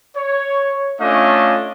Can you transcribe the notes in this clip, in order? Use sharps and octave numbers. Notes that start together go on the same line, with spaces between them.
C#5
A3 C#4 D4 F4 D#5 F5